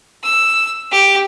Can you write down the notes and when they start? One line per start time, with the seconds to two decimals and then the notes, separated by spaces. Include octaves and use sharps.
0.24 E6
0.92 G4